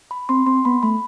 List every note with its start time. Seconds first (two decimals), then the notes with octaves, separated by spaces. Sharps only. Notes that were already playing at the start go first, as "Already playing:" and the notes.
0.11 B5
0.29 C4 C6
0.46 C4 C6
0.65 B3 B5
0.83 A3 B5